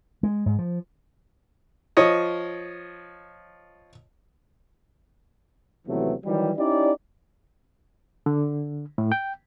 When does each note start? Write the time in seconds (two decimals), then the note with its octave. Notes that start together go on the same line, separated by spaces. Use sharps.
0.23 G#3
0.46 G#2
0.59 F3
1.97 F3 C#5 D#5
5.87 D#2 C3 E3 F#3 A3 B3
6.25 D#3 E3 F#3 G3
6.57 C#4 D#4 E4 G4 D5
8.26 D3
8.98 A2
9.12 G5